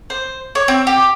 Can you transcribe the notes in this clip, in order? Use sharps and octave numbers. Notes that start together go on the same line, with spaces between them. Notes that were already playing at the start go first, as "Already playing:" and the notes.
C5
C#5
C4
G4